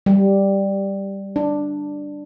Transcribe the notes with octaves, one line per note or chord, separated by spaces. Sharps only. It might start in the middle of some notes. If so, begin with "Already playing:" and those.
G3
D4